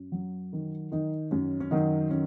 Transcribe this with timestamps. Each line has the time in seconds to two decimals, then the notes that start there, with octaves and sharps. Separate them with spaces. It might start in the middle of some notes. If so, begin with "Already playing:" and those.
Already playing: F#2
0.12 F#3
0.53 D#3
0.92 D#3 D#4
1.31 F#2 C#4
1.60 C#4
1.71 D#3 F#3 D#4
2.11 D#3 C#4